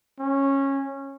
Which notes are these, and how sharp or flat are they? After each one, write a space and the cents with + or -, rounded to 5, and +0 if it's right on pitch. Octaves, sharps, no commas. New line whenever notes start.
C#4 -15